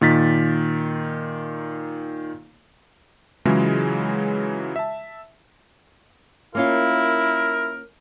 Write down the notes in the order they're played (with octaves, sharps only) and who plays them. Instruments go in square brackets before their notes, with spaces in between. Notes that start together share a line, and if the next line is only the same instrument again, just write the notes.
[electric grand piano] A#2 D#3 A6 B6
C#3 E3 F#3 G#3 E4 F4
E5 A5
[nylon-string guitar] A#3 C#4 F4 [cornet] E4 [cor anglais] A#4